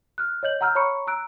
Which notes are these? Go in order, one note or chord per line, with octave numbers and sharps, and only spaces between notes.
F6 F#6
C#5 D#5 G6 F#7
F#5 A#5 E6 F6 G6
C#5 A#5 B5 C#6 C#7
A#5 E6 F#6 D7